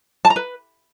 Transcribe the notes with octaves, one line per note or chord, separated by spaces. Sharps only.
A5
A#5
B4